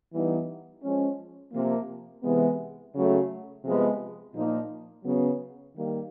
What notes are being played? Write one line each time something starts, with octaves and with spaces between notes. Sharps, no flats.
E3 G3 B3 D#4
F3 G#3 C#4
C3 F3 A#3
C3 E3 G#3 B3
C#3 F#3 A3
C3 F3 G#3 B3
A#2 F3 A#3 D#4
C#3 F#3 B3
D#3 G3 A#3